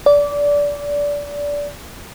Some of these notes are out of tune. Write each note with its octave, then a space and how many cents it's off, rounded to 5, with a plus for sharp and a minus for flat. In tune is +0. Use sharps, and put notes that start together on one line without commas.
D5 -20